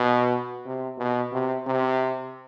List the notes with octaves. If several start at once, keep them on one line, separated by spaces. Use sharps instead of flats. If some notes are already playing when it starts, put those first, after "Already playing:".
Already playing: B2
C3
B2
C3
C3